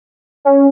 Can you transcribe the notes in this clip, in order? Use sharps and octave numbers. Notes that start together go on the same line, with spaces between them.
C#4